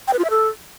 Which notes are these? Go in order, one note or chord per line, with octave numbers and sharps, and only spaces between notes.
G5
B4
F4
E5
A4